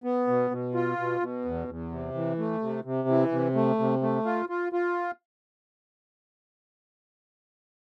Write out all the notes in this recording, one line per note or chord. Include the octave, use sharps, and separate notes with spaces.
B3
B2
B2
F4
B2
B2
E2
E2
C3
E3
A3
C3
C3
E3
C3
A3
C3
A3
F4
F4
F4